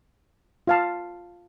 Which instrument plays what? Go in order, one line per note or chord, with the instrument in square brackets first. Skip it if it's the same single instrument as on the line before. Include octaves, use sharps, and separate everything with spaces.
[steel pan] F4 F5 A5